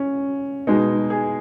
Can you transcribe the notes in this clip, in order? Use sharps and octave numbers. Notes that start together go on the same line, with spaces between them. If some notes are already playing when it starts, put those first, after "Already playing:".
Already playing: C#4
B2 G#3 D#4
G#4